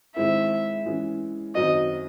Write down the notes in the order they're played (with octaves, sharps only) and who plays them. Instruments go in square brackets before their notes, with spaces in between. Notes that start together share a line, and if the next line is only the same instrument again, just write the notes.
[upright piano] D#3 G#3 C4 E4 [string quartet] E5
[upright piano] E3 G#3 C#4
[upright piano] F#2 D#3 F#3 C4 F#4 [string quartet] D#5